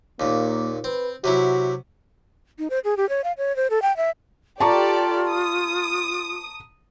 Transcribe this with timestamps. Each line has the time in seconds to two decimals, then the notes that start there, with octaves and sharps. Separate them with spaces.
0.20 D#2 A#2 A#3
0.84 C4 B4
1.24 C3 F#3 E4 F#4
2.59 D#4
2.70 C5
2.84 G#4
2.97 G4
3.09 C#5
3.24 F5
3.38 C#5
3.56 C5
3.70 A4
3.82 G5
3.97 E5
4.60 F4 G4 A4 D5 A5 A#5 C#6
5.30 D#6